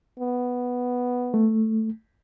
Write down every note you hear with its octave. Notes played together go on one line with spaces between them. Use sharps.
B3
A3